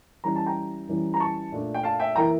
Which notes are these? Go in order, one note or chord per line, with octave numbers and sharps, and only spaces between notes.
E3 G3 C#4 E4 A#5
A5
G5 A#5
E3 G3 C#4 E4
A#5
A5 C#6
A#2 A3 D4
G5
F5 A5
E5 G5
E3 A#3 E4 G5 A#5